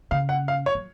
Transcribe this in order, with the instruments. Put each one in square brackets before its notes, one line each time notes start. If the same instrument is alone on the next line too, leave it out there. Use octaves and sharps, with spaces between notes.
[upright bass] C#3 [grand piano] F5
[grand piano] F#5
F5
C#5
[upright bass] F#3